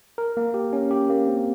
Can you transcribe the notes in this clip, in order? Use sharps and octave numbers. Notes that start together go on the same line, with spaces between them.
A#4
A#3
G4
C#4
G4
A#3
C4